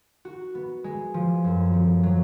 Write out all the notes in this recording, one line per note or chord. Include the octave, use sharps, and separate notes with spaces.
F#4
B3
G#3
F3
F#2
F3
F#3